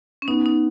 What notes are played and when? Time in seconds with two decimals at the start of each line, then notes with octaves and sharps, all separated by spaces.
0.22 C#4
0.28 B3 D#4
0.46 D#4